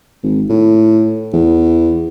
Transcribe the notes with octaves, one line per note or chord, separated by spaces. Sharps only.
G#1
A2
E2